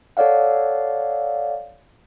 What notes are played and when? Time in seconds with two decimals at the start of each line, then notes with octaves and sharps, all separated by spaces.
0.17 A4 C#5 D5 F5 F#5